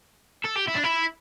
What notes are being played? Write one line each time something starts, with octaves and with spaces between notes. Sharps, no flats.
A4
G4
E4
D4
E4